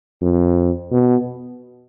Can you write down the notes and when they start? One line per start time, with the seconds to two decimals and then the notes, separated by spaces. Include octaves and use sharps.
0.21 F2
0.92 B2